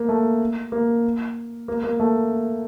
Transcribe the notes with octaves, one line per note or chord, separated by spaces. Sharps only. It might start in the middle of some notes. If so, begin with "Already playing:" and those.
Already playing: A#3
A3
A#3
A#3
A#3
A3